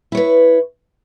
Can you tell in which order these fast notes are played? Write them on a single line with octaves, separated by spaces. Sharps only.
E4 C#5 B4